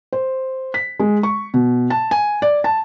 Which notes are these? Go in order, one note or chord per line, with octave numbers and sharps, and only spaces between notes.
C5
B6
G#3
C#6
B2
A5
G#5
D5
A5